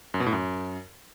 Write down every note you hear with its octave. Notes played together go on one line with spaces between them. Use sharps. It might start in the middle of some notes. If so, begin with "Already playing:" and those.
F#2
B2
A2
F#2